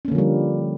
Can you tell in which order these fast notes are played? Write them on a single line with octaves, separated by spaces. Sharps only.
C#4 A#3 D3 F3 G3